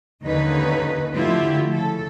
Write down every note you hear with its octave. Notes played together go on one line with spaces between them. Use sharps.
D#2 D3 C#4 D#4 B4
D3 F3 A3 E4 F4 G4
C#3 A4